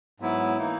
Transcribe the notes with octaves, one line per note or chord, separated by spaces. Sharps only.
G#2 F#3 B3 E4
E3 A#3 D#4